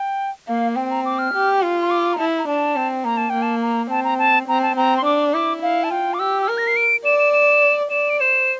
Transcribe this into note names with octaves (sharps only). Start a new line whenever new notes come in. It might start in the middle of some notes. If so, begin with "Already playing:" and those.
Already playing: G5
A#3 F5
C4 G5
A#5
D6
F6
G4
F4
C6
D6
A#5
E4 A5
A#5
D4 A5
C4
A#3 A#5
A5
A#3 G5
A5
A#5
C4 A5
A#5
A5
C4 A#5
A5
C4 A#5
C6
D4 D6
E4 D6
E4 F5
A5
F4 G5
D6
G4 E6
E6
A#4 F6
A#6
C7
D7
D5 E7
E7
E7
D5 E7
D7
C5 E7